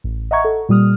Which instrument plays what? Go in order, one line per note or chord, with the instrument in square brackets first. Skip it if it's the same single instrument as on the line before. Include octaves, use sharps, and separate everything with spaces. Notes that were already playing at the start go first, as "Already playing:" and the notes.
[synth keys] A1
D#5 E5 F#5 A#5 C#6 G#6
A4
A#2 G3 D#6 F6